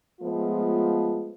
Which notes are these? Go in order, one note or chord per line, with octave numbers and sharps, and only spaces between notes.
F3 G#3 A3 B3 F4